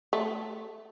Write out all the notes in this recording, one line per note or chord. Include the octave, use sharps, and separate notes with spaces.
A3